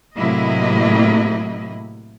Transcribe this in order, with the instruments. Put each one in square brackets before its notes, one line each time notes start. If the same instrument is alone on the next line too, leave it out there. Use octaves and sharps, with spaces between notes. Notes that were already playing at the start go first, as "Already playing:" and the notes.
[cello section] A2 C3 F#3 A#3 E4 D#5